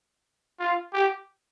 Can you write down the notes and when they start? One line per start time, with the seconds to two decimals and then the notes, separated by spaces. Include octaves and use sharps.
0.60 F4
0.93 G4